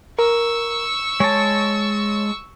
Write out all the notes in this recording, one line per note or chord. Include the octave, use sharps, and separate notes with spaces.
A#4 C#6 E6
G#3 C#5 A5